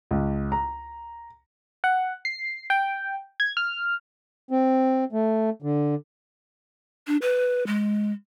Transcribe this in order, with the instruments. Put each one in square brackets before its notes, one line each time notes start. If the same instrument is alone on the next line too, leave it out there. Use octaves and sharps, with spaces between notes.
[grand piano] C#2
A#5
[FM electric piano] F#5
C7
G5
G#6
F6
[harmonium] C4
A3
D3
[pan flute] D4
B4
G#3